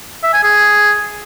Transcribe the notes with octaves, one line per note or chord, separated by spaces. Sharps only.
E5
G#5
G#4